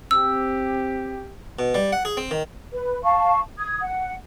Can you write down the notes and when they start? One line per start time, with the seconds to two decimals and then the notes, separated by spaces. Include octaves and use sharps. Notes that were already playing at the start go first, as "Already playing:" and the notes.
0.11 C4 G4 E6
1.59 B2
1.74 G3
1.93 F#5
2.05 G#4
2.17 C4
2.31 D#3
2.72 B4
3.03 F5 A5 C#6
3.58 D#6 G#6
3.81 F#5